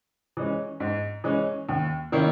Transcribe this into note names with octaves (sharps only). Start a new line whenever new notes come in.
E3 G#3 C#4
G#2
E3 G#3 C#4
D#2
D#3 A#3 C#4 E4